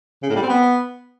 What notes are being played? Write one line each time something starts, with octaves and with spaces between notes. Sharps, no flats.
C#3
A2
G3
C4
B3